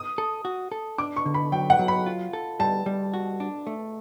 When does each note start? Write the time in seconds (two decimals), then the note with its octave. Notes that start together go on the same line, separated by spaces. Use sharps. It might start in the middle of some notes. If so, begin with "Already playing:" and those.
Already playing: D#6
0.18 A4
0.45 F#4
0.72 A4
0.98 D4 D6
1.16 C#6
1.26 D3
1.34 B5
1.52 F#3 G5
1.70 F#5
1.79 F#3
1.88 B5
2.06 F4
2.33 A4
2.59 G3 A5
2.86 G3
3.14 F#4
3.40 D4
3.67 A3